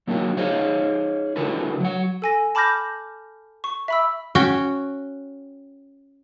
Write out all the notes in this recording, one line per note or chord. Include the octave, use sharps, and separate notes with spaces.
F#3 A#3 D4 F4 F#4
D#4 G#4 C5 C#5 F5
C#3 E3 D4 F#4 A4 B4
F#3 F#5
A4 G#5 A#6
A5 B5 D6 F6 G6 A#6
C#6
E5 B5 E6
C#4 F#4 G5